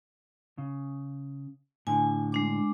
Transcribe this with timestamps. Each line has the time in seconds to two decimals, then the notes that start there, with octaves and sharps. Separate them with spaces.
0.58 C#3
1.87 A2 D3 G#5
2.32 G#3 D4 D6